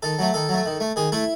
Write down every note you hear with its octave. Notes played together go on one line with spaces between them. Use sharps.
D#3 A4
F#3 A3
D#3 A4
F#3 A3
D#3
A3
D#3 G#4
A3 E4